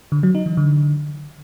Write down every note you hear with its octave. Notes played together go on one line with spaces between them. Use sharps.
D3
F#3
D#4
E3
D3